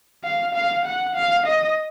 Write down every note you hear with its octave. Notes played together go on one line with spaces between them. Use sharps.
F5
F5
F#5
F5
D#5